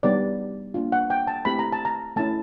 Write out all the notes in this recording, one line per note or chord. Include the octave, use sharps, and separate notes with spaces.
G3 B3 D#4 G4 D5
A#3 D4 F4
F#5
G5
A5
A3 C4 E4 G4 B5
A#5
A5
A#5
A3 C#4 E4 A5